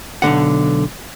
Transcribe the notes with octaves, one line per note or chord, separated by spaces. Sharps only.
B1 G2 D3 F#5